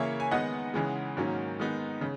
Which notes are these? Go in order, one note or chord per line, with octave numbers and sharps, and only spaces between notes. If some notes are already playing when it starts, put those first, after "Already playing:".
Already playing: C#3 E3 A#3 C#4 C#5 E5
G#5
D#3 G#3 B3 D#4 D#5 F#5
C#3 E3 G#3
G#2 D#3 F#3 A#3 C#4
D#3 G#3 B3 D#4
C#3